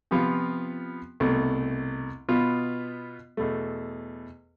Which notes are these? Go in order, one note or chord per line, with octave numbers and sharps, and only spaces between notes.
C3 F3 B3 F4
C2 B2 A3
B2 B3 F4
E2 B2 A3